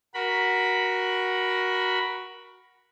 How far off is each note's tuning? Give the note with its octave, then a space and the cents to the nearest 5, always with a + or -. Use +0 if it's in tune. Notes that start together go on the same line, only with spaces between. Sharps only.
F#4 +0 A#4 +15 B5 +0